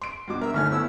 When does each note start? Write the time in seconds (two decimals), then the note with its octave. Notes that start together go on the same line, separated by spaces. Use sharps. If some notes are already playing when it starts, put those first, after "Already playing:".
0.02 C6 D7
0.27 G2 B2 D6
0.41 A#4 E5
0.54 G1 E2 D#3 A3 G#5 F6
0.71 B3 E4 C#5 E6